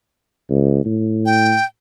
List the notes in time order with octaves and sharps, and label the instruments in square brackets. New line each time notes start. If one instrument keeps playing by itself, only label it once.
[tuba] C#2
A2
[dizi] G5